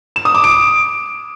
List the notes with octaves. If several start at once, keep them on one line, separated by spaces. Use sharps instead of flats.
E7
D#6
D6
D7